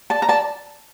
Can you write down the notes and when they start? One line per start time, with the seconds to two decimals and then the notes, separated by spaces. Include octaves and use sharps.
0.10 D5 A5
0.22 A#5
0.29 D5 A5